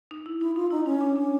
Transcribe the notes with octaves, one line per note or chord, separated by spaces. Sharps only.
D#4
E4
D#4 E4
D#4 F4
D#4 E4
C#4 D#4
D4
D4